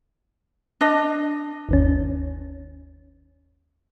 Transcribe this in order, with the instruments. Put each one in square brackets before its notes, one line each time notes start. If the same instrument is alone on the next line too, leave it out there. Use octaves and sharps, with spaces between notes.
[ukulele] D4 D#5
[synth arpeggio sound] G1 D#2 C#4